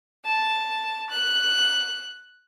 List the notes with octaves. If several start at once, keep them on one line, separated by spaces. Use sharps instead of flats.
A5
F#6